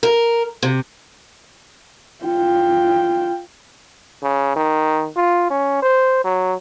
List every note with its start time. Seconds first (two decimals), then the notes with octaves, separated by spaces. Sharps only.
0.03 A#4
0.63 C3
2.25 F4 G5
4.22 C#3
4.56 D#3
5.17 F4
5.50 C#4
5.82 C5
6.25 F#3